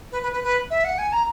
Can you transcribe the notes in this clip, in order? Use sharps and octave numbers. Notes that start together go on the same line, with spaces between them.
B4
B4
B4
B4
E5
F#5
G#5
A#5